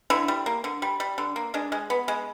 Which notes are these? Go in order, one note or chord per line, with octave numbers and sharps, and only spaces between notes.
D3 E4
G3
A#3
D3
G3
G3
D3
A#3
G#3 D4
G#3
B3
G#3